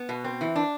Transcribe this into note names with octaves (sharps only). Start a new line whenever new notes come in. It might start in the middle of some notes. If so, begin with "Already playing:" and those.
Already playing: B3
B2
C4
E3
D4